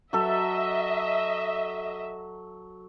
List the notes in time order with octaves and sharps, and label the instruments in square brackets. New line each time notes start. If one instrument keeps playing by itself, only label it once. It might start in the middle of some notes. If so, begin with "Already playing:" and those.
[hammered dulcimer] F#3 A4 [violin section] D#5 E5